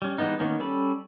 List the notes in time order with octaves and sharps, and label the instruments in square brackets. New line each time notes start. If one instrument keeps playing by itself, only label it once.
[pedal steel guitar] G3 C#4
E3 G3 G#3 B3 D#4
D#3 A#3 B3 C#4 D#4
G3 C#4 A4 B5